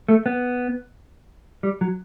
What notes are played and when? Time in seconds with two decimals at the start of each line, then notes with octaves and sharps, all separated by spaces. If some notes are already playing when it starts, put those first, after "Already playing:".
0.09 A3
0.26 B3
1.63 G3
1.81 F#3